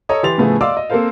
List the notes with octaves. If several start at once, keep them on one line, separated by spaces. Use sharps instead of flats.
A4 C#5 D#5 A#5 D#6
E3 G4 C6 A6 F7
A2 C#3 F3 A3 B3 G#4
D5 D#5 F5 C6 D6 E6
D#5
A#3 C4 A4 A#4 C5 F5